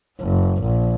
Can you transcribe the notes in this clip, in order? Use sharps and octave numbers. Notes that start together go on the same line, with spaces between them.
F#1
A#1